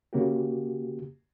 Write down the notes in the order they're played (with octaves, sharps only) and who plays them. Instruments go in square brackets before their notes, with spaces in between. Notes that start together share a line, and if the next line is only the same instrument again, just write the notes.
[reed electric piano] C#3 A#3 F#4 G4